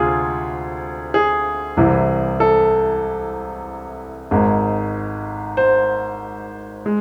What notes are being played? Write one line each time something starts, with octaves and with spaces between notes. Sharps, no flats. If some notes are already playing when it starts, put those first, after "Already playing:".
Already playing: D2 C3 F4 G#4
G#4
C2 C3 E3
A4
G#1 G#2 G#3
C5
G#3